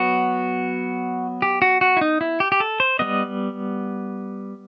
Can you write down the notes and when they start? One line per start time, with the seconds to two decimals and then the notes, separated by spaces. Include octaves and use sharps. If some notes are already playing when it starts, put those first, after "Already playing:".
Already playing: F#3 B3 F#4
1.42 G4
1.62 F#4
1.81 F#4
1.97 E4
2.01 D#4
2.21 E4
2.40 G4
2.52 G4
2.60 A4
2.80 C5
2.99 G3 B3 D#5